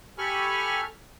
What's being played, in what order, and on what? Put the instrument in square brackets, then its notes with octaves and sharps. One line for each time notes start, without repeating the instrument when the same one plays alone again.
[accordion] G4 A4 G#5 B5 C#6 F6